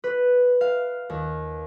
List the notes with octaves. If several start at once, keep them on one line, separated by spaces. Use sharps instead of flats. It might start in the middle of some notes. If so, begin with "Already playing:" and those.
B4
F5
D#2